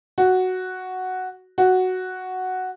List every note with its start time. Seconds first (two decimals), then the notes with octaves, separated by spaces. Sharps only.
0.18 F#4
1.58 F#4